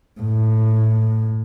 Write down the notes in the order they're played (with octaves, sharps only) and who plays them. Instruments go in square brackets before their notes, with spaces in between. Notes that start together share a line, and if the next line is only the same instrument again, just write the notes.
[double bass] A2